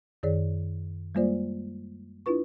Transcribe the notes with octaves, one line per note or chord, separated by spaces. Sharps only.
F#2 D#3 G#4 C#5 D5
G3 G#3 A#3 F4 C5 D5
D4 E4 F4 B4 C#6